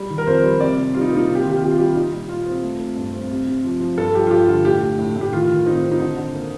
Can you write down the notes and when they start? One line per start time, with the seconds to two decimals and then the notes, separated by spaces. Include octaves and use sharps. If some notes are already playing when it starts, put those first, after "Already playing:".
Already playing: G3
0.10 D#3
0.18 A#4
0.27 F2 C5
0.44 G3
0.60 C3 D5
0.77 C3
0.94 G3 F4
1.01 D#4
1.11 A#3 D#4
1.28 C3 F4
1.35 G4
1.43 D#3 F4
1.50 G4
1.57 F4
1.62 C3 G4
1.71 F4
1.78 G3 G4
1.86 F4
1.95 G3 D#4
2.13 A#2
2.29 A#2 F4
2.46 C4
2.63 A3
2.79 C4
2.96 G2
3.13 C4
3.31 C3
3.47 C3
3.64 F3
3.80 F3
3.97 G2 A4
4.15 F3 G4
4.27 F4
4.31 G2 G4
4.48 D3 F4
4.65 A2 G4
4.82 A2
4.99 A2
5.16 A2
5.21 G4
5.32 D#3 F4
5.49 D#3
5.66 C4 D#4
5.83 C4
5.92 D#4
6.00 D3
6.17 D3
6.34 A#3